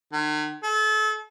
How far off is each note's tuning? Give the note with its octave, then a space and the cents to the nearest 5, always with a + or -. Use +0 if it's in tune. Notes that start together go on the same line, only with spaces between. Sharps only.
D#3 -45
A4 -35